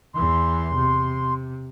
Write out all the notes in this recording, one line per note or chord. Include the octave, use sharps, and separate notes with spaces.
E2 E3 C6
C3